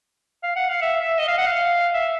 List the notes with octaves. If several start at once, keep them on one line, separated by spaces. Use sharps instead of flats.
F5
F#5
F5
E5
E5
D#5
F5
F#5
F5
E5